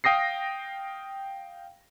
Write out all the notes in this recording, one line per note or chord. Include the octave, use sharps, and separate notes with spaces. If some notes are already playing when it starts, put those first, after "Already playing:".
F5 G5 D#6 A#6 C7